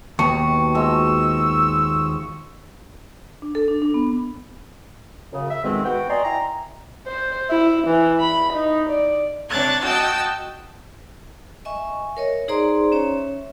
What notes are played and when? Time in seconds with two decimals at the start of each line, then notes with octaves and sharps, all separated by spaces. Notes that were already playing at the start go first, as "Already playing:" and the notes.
0.19 D#2 B2 G4 A5 C#6 C#7
0.75 F3 G#3 F#4 E6
3.42 D4
3.55 A4
3.68 D4
3.82 D4
3.94 B3
5.32 F#2 C#3
5.49 E5
5.63 F2 G#2 B2 D#3 G#3 C4
5.85 B3 F#4 G5
6.08 D5 D#5 G#5 A#5 C6
6.24 E4 G5 G#5 A#5
7.07 C5
7.50 E4
7.88 E3
8.20 B5
8.53 D#4
8.90 D5
9.49 C3 D4 C#5 F#6 G#6 A6
9.83 F#4 D#5 G5 A5 E6 G6
11.65 D#5 E5 G#5 C#6
12.17 A#4 C#5 D#5
12.48 D#4 G#4 C5 D5 A#5 C6
12.92 C#4 C#5 E5